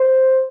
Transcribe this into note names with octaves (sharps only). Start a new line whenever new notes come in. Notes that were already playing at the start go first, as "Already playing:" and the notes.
Already playing: C5